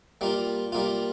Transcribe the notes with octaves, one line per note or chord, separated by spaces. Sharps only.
G3 A#3 F4
G3 A#3 F4